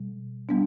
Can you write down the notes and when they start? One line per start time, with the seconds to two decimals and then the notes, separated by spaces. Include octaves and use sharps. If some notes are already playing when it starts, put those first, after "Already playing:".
Already playing: B2 G3
0.49 G3 B3 D4